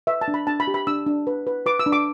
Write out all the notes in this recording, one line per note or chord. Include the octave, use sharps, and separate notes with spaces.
B4 E5
A5
D4
B5
D4 A5
B5
G4
B5
D4 E6
D4
B4
B4
B4 D6
E6
D4
D6